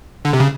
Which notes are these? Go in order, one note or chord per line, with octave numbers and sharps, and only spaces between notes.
D3
C3
C#3